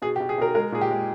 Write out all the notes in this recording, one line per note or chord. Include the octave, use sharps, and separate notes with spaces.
B2 G#4
G4
B2
G#4
B2 A#4
G#3 A#4
A#2 G#4
G4
G#3